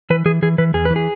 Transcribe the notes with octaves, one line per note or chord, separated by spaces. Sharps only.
E3 B4
E3 G#4
E3 G#4
E3 B4
E2 G#4
E3 B4
G#4